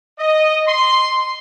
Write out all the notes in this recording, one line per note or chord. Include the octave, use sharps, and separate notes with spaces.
D#5
C6